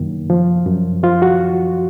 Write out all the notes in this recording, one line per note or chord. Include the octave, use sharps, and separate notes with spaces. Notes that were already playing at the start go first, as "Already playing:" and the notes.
Already playing: F#2 D#3 A#3
F3
F#2
F3 F4
F#4